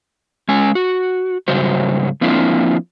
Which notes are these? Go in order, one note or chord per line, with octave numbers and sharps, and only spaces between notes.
G#3 C#4 G#5
F#4
G#2 C#3 F#3 G3 F#4 C5
F3 A#3 C4 D4 E4 F4